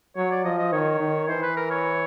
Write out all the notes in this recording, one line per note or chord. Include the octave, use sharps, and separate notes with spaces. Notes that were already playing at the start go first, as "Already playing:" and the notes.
F#3 C#5
D5
F3 D#5
D#5
D#3 C#5
D#3
E3 C5
B4
A#4
C#5